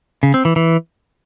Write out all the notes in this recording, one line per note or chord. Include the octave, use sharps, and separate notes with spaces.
C#3
C4
E3
E3